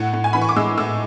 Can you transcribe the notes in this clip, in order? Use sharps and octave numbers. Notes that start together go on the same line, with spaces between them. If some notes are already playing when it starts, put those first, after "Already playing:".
Already playing: A2 F#5
A2
G#5
E3 B5
C#6
D6
G#3 E6
A2 E6